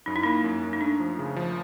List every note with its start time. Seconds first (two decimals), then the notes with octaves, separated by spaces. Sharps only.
0.06 F#2 D#4
0.16 E4
0.23 A#3 D#4
0.44 F#2
0.63 F#2
0.73 D#4
0.81 A3 D4
1.00 F3
1.19 C#3
1.36 F3